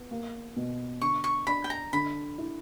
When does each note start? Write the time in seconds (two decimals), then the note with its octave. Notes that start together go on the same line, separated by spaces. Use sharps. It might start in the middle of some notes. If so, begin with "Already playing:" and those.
Already playing: B3
0.11 A#3
0.56 B2
1.01 D3 C#6
1.24 C#6
1.47 D4 B5
1.64 G5
1.70 A#5
1.93 D3 B5
2.38 E4